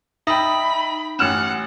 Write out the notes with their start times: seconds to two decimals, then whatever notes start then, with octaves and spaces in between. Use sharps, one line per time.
0.27 D#4 E5 G5 B5 D#6 A#6
1.19 A1 C#4 F#5 F6 E7